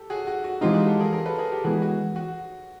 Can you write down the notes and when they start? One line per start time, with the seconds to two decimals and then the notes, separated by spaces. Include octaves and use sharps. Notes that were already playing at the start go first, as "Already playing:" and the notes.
Already playing: G4 A4
0.10 F#4 G#4
0.27 F#4
0.44 F#4
0.61 E3 G#3 C4 D#4 F4 G4
0.74 F#4 G#4
0.87 G4 A4
1.00 G#4 A#4
1.12 G#4 A#4
1.26 A4 B4
1.38 G#4 A#4
1.51 G4 A4
1.64 E3 G#3 B3 F#4 G#4
1.82 F#4
2.16 F#4